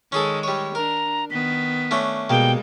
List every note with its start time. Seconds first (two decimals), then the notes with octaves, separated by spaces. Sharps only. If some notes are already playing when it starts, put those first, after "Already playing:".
0.12 D#3 G#3 C#4 G#4 A4
0.43 G3 C#5
0.75 D4 A#4 A#5
1.31 D#3 B3 B6
1.91 A3 C#4 D4
2.30 B2 G3 G#3 A#3 G5